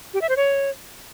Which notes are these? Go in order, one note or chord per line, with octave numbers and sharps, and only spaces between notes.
G4
E5
C5
C#5